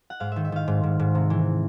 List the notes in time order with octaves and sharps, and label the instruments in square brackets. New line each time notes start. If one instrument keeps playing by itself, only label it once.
[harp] F#5
G#2 F5
D#3 E5
E5
D#3 F5
G#2
G#2
G#2
C3
E3